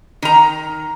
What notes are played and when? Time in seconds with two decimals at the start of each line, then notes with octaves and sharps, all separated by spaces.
0.22 D#3 A#5